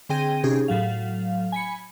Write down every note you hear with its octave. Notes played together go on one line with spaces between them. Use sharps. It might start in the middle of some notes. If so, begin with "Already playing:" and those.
D3 C4 G#4 G5 A#6 D#7
C3 C#4 D#4 G4 G#4
A2 F#3 F5
G#5 B5 C#7